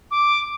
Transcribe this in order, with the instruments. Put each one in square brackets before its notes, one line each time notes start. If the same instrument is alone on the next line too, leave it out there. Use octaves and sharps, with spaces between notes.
[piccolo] D6